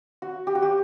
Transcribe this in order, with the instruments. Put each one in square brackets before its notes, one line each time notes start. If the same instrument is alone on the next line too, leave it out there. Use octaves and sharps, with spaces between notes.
[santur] F#4
G4
F#4
G4